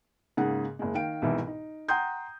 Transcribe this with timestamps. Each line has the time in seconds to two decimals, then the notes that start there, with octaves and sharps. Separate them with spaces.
0.37 G#2 C#3 A#3 G#4 F#5
0.79 F#1 G#3
0.95 D#3 F5 G5 D7
1.22 C2 G#2 B2 E3
1.47 D#4
1.88 F#5 G5 A#5 C6 D#6 G6